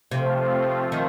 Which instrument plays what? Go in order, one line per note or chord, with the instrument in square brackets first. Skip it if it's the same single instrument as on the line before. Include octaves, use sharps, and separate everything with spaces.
[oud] C3 [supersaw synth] F3 A3 C4 F4
[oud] D#3